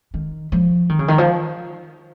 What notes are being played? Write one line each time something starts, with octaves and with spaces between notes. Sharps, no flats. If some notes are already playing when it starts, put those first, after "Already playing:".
D#3
F3
D#3
C#3
D#3
F3